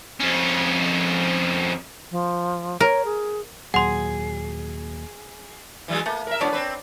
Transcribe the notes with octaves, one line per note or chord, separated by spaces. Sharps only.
F2 C#4
F3
A#4 C#5
G#4
D#2 A#2 F#3 G#4 F#5 C6
E3 F#3 G#3
A3 A#3
A#4 E5
F#2 A2 B3 D4 C#5 D5
C4 B4